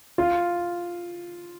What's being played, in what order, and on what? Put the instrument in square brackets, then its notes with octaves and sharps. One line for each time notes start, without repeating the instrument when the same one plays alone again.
[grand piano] F4